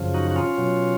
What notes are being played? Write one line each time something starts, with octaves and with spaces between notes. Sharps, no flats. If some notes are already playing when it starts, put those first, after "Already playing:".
Already playing: F#2 C#3 F3
D#4 F#4
F#4
C#4 F4
B2 F#3